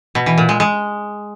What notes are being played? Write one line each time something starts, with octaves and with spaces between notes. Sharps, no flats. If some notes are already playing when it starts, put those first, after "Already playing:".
B2
E3
A#2
G#3
G#3